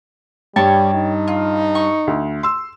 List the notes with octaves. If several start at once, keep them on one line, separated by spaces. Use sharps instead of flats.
G2 G3 C#5 G5 A5
D#4
F4
C#6
D2
C6 E6